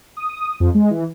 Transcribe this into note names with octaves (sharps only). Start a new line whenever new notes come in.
D#6
F2
G#3
E3